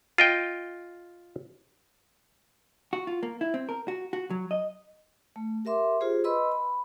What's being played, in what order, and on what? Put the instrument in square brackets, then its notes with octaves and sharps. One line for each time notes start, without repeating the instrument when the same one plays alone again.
[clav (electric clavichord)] F4 D#5 G5
[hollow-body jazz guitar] F#4
F4
A#3
E4
C4
A#4
F#4
F#4
F#3
D#5
[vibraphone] A3
G4 A#4 E5 C6 D6
F4 G4 G#4 C5
B4 D#5 B5 C6 E6
B5